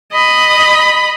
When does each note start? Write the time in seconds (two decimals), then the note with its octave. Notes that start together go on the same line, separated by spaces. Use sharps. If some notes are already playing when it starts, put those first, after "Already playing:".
0.12 D#5 B5